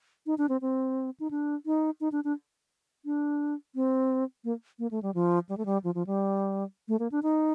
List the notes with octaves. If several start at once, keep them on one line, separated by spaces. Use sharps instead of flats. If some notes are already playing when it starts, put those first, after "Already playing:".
D#4
D4
C4
C4
D#4
D4
D#4
D#4
D4
D4
D4
C4
A#3
A#3
A3
G3
F3
G3
A3
G3
F3
F3
G3
A3
A#3
D4
D#4